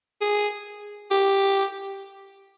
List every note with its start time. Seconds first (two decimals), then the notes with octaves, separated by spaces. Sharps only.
0.21 G#4
1.11 G4